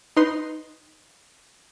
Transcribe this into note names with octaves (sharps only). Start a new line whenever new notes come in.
D#4 B4 C6